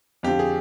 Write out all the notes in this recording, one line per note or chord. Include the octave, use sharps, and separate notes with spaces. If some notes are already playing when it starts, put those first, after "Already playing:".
F2 D3 F3 G4
G#4